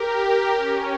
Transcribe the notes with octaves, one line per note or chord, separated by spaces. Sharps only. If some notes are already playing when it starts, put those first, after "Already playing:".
Already playing: G4 A#4
C#4